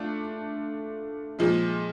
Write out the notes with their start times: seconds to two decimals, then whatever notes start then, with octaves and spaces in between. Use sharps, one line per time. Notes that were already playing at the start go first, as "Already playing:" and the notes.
Already playing: A3 D4 F4
1.39 A#2 F3 G#3